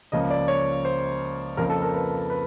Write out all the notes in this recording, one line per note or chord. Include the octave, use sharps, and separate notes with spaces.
C#2 C#3 F3 A#3 D#5
D5
C#5
C5
F2 C#3 F3 A#3 A#4
A4
A#4
B4
B4